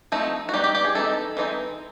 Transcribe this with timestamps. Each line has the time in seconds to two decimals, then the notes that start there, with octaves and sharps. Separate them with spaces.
0.12 F3 A3 C4 D#4
0.49 F#4
0.53 G3 B3 D#4 G4
0.64 G4
0.75 G4
0.85 G#4
0.95 E3 G#3 C4 D#4 A4
1.37 E3 G#3 C4 D#4